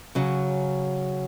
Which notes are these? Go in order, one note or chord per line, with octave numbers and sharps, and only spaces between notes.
C#3 F#3 C#4